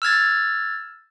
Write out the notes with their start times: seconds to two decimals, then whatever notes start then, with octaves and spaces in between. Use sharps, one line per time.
0.02 E6 F6 G#6 A6